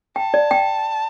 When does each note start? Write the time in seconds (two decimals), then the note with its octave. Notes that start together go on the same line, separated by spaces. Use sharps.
0.16 G5 A5
0.34 D5
0.51 G5